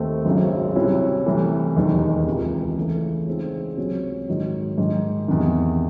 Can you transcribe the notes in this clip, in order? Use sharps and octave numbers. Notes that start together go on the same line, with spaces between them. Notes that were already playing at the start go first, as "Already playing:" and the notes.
Already playing: D#2 D#3 A3 C4
G#1 F#2 C#3 F#3 C4
C2 C3 F#3 C#4 E4
C2 C3 E3 A3
E1 D#2 D#3 G#3 D#4
C#2 C3 E3
C#3 E3 A3
C#3 G#3 C4 D#4
C#2 C3 F#3 C#4 F#4
G#2 D#3 F#3
G#2 D#3 G#3
E2 C3 D#3